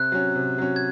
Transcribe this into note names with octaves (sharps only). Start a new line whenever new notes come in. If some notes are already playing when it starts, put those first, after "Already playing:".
Already playing: C3 F#6
F#3 C#4
C3
F#3 C#4
G#6